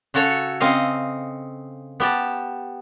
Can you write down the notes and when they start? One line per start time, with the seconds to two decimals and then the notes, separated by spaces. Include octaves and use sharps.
0.14 C#3 F#4 A4 C#5
0.60 C#3 C4 D#5 F5
2.00 B3 G4 A5